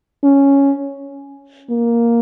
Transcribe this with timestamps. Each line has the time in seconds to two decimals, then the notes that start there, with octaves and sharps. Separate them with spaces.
0.24 C#4
1.71 A#3